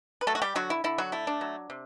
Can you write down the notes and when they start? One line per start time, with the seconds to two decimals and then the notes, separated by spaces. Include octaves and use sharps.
0.21 B4
0.27 F#3 A3 A4
0.35 F#4
0.42 G3 G4
0.55 D3 F#3 F#4
0.70 E4
0.84 D3 E4
0.98 F#3 F#4
1.12 A3 E4
1.27 D4
1.41 F#3
1.70 C3